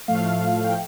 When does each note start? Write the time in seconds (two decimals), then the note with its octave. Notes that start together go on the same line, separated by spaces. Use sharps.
0.08 A2 F3 A3 F5
0.64 G5